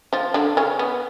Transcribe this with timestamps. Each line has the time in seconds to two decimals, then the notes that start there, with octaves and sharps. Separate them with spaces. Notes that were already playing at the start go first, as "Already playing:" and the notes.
0.13 F3 F4
0.34 D3 D4
0.57 C#3 C#4
0.79 B3